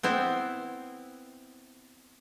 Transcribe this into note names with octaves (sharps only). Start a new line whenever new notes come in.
B3 C4 E4